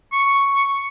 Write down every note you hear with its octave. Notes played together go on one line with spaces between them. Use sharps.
C#6